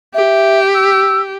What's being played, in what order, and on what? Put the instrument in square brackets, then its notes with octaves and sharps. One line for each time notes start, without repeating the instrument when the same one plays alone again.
[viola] G4 [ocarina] E5
[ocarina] E6